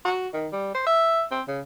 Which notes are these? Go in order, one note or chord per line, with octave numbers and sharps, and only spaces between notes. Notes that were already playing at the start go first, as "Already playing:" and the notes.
F#4
D#3
G3
C5
E5
C4
C#3